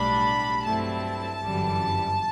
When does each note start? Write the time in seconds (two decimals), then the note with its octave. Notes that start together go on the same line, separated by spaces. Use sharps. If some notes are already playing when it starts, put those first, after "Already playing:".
Already playing: B1 A2 G3 D4 B5
0.64 G2 F#3 A3 C4 E4 A5
1.42 G1 F#2 E3 G3